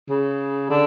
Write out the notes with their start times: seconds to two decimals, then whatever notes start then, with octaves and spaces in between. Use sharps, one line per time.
0.09 C#3
0.70 D3